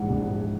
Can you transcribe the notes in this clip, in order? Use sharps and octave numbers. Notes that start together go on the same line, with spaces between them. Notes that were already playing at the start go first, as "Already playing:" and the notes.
Already playing: A#1 G#2 E3 F#5
A#1
G#2